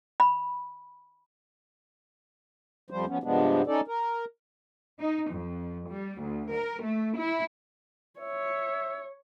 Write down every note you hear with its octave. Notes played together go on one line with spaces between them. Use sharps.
B5
F2 F3 G3 C5
F3 B3 C#4
G2 C3 F3 G#3 B3 D4
C#4 D#4 A4 D5
A#4
D#4
F2
G3
D2
A#4
A3
E4
C#5 E5